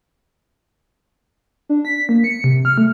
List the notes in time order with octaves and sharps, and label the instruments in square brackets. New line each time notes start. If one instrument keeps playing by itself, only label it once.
[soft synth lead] D4
B6
A#3
C#7
C3
F6
A3